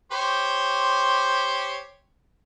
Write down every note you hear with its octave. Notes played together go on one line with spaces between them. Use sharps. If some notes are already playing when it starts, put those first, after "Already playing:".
G4 C5 C#5